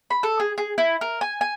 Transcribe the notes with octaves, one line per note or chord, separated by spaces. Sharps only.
B5
A4
G#4
G#4
E4
A#4
G#5
G#5